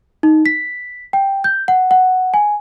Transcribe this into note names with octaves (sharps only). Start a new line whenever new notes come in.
D#4
B6
G5
G6
F#5
F#5
G#5